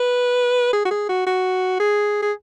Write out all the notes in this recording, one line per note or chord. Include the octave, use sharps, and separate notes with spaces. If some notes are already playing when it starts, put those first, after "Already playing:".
Already playing: B4
G#4
F#4
G#4
F#4
F#4
G#4
G#4